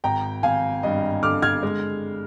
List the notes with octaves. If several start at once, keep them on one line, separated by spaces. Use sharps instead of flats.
G#1 G5 A#5
G#1 F5 G#5
G2 D#5
D3 D6 F6
F6 G#6
G#3